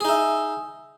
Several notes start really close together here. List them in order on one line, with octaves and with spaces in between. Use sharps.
G#4 D#4 E5